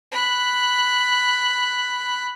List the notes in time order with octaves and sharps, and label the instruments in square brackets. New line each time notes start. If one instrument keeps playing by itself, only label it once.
[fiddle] B5 F#6